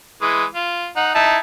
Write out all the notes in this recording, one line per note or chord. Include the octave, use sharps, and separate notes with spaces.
E3 G#3
F4
D#4 F#5
D#4 E4 A5